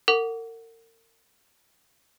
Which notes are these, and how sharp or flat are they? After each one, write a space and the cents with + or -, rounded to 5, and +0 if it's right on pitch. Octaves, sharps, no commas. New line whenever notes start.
A#4 -40 F#5 +0 D6 -45